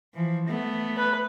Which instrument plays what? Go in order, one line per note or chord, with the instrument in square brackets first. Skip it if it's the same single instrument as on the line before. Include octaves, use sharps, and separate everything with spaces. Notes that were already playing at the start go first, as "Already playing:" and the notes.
[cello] E3 F3
A3 B3
[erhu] B4